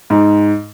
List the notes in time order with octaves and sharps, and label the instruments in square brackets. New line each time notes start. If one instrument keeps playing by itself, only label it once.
[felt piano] G#2